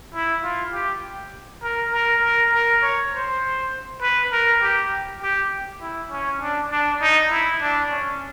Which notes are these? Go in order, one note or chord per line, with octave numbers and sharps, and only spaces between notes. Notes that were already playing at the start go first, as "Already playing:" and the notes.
E4
F4
G4
A#4
A#4
A#4
A#4
C#5
C5
B4
A#4
G4
G4
E4
C#4
D4
D4
D#4
E4
D4
C#4